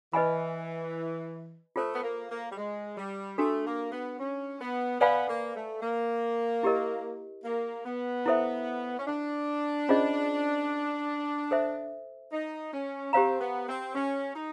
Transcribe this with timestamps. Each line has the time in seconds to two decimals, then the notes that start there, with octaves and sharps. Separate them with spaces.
0.13 E3 B4 D#5 G#5 B5
1.76 A3 F4 A4 C5
1.94 B3
2.03 A#3
2.30 A#3
2.51 G3
2.57 G#3
2.97 G3
3.38 A3 D4 F#4 A4
3.66 A#3
3.92 B3
4.20 C#4
4.60 B3
5.01 B3 B4 D5 F5 G#5 B5
5.29 A#3
5.55 A3
5.82 A#3
6.63 E4 G4 A#4 D#5
7.44 A#3
7.85 B3
8.26 E4 A4 C5 E5
8.99 C#4
9.07 D4
9.89 C#4 F4 G#4 C5 D#5
11.51 A4 C5 E5
12.32 D#4
12.73 C#4
13.13 C4 G4 C5 F5 A#5
13.40 B3
13.68 C4
13.94 C#4
14.35 D#4